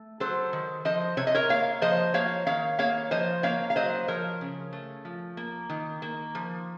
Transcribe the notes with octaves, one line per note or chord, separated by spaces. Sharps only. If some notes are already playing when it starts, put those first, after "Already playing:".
Already playing: A3
F#3 A4 C5
D#3
F3 C5 D#5
C3 C#5
D#5
A#4 C#5
A#3 C#5 F5
F3 C5 D#5
A#3 C#5 F5
D#3 C#5 F5
A#3 C#5 F5
F3 C5 D#5
A#3 C#5 F5
F5
F#3 C5 D#5
F3 A#4 C#5
C#3
A3
F3
A#3
D#3
A#3
F3